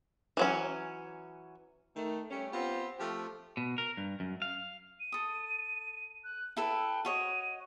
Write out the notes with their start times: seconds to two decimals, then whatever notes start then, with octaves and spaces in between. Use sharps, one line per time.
0.37 E3 F#3 C#4
1.94 D#3 A3
2.31 G3 A3 C#4
2.53 B3 C4 F4 G4
2.98 F3 A3 C4 G4
3.57 B2
3.78 A#4
3.97 G2
4.20 F#2
4.42 F5
5.00 D#7
5.12 A4 D#6
6.24 F#6
6.57 E4 A4 B4 G5
7.05 F#4 C#5 D#5 D#7